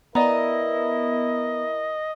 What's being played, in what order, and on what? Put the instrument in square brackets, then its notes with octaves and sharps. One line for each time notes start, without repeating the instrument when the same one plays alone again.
[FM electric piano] B3 [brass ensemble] E4 A#4 [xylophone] D5 A#5 [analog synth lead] D#5